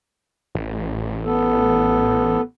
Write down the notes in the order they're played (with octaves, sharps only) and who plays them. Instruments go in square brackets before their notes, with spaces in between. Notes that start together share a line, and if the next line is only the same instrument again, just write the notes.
[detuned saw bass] A1
[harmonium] B3 A4